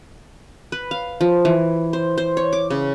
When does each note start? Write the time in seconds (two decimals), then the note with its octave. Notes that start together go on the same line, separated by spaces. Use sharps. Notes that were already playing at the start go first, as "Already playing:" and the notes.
0.72 B4
0.91 F5
1.21 F3
1.45 E3
1.93 C5
2.18 C5
2.37 C#5
2.53 D6
2.70 C#3